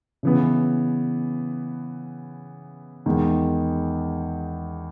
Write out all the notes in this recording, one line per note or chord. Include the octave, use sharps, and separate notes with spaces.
C#3 E3 B3
E2 D#3 G#3